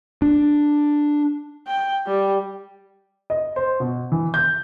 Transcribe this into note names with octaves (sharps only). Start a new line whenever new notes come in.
D4
G5
G3
D#5
C5
B2
E3
G6